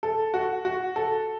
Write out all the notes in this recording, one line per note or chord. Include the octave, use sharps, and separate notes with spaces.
A4
F#4
F#4
A4